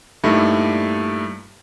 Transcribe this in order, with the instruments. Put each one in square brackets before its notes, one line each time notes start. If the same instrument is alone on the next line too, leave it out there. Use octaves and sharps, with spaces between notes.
[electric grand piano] G2 A#2 G3 A3 D#4 E4